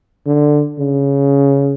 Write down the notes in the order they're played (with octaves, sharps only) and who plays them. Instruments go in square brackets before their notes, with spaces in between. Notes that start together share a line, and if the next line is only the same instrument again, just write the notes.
[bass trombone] D3
C#3